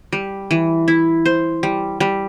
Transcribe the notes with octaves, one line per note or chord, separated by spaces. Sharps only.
G3
E3
E4
C5
G3
G3